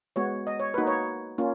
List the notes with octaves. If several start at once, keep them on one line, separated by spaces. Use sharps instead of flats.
G#3 B3 F#4 C#5
D#5
C#5
A#3 D#4 F#4 B4
C#5
A#3 C#4 F4